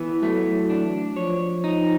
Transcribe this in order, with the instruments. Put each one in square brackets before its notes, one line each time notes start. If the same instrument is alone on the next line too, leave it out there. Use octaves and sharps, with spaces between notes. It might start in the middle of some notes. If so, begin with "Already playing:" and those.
Already playing: [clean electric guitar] E3 B3
[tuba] F#3 [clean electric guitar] A3
[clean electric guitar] D4
[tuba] F3 [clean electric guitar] C#5
[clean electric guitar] D#4